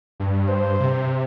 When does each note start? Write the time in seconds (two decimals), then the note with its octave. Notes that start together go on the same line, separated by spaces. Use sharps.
0.20 G2
0.49 C5
0.80 C3